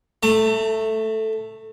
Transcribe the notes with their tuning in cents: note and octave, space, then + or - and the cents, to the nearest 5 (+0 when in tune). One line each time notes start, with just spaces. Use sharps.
A3 +0 A5 +45